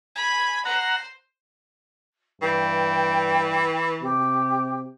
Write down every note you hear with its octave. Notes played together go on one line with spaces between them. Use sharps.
G#5 B5
C5 F#5 A#5
G2 E3 G5
C3 G4